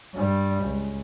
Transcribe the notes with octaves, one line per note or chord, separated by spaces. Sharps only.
G2 G3
C#2